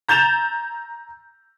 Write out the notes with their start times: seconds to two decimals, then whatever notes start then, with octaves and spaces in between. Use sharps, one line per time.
0.08 A#5 G6 A6 E7 F7